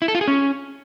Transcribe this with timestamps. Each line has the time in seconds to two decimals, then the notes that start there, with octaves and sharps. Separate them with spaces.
0.02 E4
0.08 A4
0.15 F4
0.21 G#4
0.28 C#4